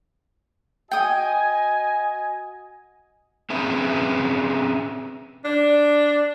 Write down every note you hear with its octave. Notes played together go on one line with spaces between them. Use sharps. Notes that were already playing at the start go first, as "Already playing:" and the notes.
F#4 D#5 G5 G#5 D#6
C4 C#4 G#4 B4 E5
D4